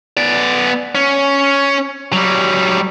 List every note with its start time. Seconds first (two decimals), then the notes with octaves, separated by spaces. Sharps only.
0.17 B3 D5
0.95 C#4
2.13 F#3 G3